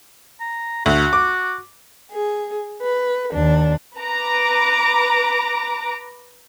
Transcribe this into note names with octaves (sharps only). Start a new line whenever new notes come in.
A#5
D2 F#4
D6
G#4
B4
D#2 D4
B4 A#5 D6